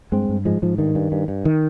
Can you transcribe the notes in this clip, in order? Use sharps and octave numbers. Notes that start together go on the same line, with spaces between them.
G2 G#3 C4
G2
G#2 F3 G#3
G#2 F3
G2 D#3
G2
G2
G2
D#3